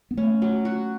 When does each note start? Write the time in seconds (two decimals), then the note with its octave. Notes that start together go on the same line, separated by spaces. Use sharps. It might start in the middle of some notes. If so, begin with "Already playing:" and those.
0.11 B3
0.17 A3 C#4
0.42 F#3
0.65 F#4